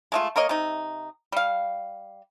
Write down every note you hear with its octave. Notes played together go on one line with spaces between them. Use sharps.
G#3 A3 F4
A#3 A#4 C#5 D#5
C3 D#4
G3 F5